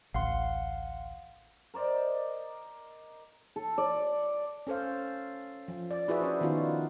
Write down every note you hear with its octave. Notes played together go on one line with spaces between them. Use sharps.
A1 D2 F5 F#5 C6
A#4 C5 D5 D#5
A4
D5
C#4 A4 C5 F5
F3
D5
E4 F#4 G#4 B4 E5
C#4 D4 C5
D#3 B3 D#4 F4 F#4